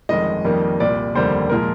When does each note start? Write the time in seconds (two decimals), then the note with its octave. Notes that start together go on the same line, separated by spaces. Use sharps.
0.09 G1 F2 D#3 G#3 D#5
0.44 F2 D#3 G3 A#3
0.80 C2 A#2 G3 D5
1.15 F1 D#2 D3 G3 A#3 C5
1.50 A#2 F3 G#3 A#4